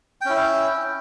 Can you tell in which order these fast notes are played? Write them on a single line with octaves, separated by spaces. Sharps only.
G5 C#4 E4